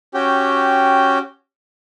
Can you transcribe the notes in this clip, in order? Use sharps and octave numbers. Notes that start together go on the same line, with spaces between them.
C#4 F#4 G4 G5